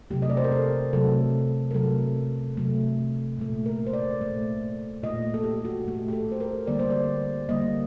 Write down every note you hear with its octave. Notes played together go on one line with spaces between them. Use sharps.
C3 F#3 A3 G4
D#5
D5
C5
A#4
A4
C3 F#3 A3 A4
A#4
C3 F#3 A3 A4
C3 F#3 A3
A#2 A3
A#4
C5
D5
A#2 A3
A#2 A3 D#5
A4
G4
F#4
A#2 A3 G4
G4
A4
C5
A#4
D3 G3 A#3 D5
C5
D5
D3 G3 A#3 D#5